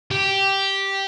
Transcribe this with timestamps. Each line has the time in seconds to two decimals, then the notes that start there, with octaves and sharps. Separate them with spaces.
0.11 G4